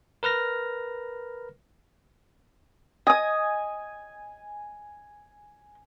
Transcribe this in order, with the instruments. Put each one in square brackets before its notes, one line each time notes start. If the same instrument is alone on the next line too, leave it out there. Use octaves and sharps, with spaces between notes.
[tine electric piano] A#4 B4 F6 A#6
[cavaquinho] D#5 D#6 [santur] G#5